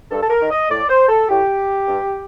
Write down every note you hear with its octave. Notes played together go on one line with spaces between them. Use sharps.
G2 A4
A4
A#4
D#3
D#5
A2 D5
C5
A4
A2 G4
G2